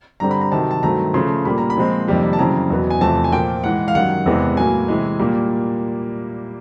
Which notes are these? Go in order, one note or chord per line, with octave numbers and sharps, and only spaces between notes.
G2 D3 G3 C4 A#5
B5
A#5
C3 D#3 F#3 A5
A5
G2 D#3 F#3 A3 C4 A#5
C#3 F3 A3 C6
A#2 G3 A#3 B5
A#5
B5
A#2 F3 G#3 C4
F2 C3 D#3 G3 A#3
A5
F#2 C#3 E3 G3 C4 A#5
E2 B2 F#3 B3
G#5
E2 C3 F3 A3 C4 A5
G#5
A#2 F3 A#3 G5
G#2 E3 G#3 F#5
F5
F#2 D#3 G3 F#5
E2 C3 E3 G#3 B3
A2 F#3 A#3 G#5
C3 E3 G#3
A#2 G3 A#3